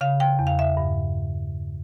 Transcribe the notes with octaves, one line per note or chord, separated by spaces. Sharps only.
C#3 F5
G5
E2
F5
E5
G2